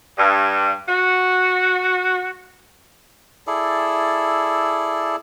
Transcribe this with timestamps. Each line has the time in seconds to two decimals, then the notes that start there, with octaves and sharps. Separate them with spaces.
0.18 G2
0.89 F#4
3.47 E4 G#4 A4 D5